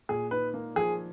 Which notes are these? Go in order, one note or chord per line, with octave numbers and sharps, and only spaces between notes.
A#2 G#4
D#4 B4
A#3
F3 G#4